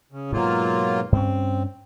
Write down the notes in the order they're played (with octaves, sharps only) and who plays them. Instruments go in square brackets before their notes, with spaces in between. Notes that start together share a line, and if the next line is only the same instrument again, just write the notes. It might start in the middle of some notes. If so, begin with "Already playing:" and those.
[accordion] C#3
[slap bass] G#2 B2 [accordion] F#3 A#3 F4
[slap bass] G2 C#4 [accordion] C4